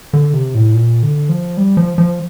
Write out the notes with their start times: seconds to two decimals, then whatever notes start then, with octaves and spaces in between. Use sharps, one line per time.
0.13 D3
0.34 C3
0.55 A2
0.75 A#2
1.03 D3
1.29 F3
1.57 G3
1.77 F3
1.98 F3